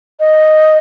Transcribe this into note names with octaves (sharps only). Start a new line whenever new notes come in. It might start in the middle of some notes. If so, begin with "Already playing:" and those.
D#5